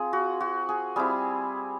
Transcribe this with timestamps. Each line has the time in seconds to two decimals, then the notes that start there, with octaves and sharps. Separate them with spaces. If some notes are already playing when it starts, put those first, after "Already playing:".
Already playing: C4 F4 G#4
0.13 F#4
0.40 F#4
0.69 G#4
0.96 G3 C4 E4 G#4